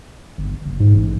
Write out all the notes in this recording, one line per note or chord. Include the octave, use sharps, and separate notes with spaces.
G1
F#1
G#2
A1